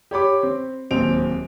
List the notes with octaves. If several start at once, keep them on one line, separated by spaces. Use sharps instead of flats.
G4 C#5 B5 D6
C4
D1 D#2 C4 D7 F7